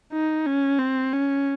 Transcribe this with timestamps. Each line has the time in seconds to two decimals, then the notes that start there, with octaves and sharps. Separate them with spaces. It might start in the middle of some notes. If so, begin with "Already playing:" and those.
0.12 D#4
0.46 C#4
0.79 C4
1.13 C#4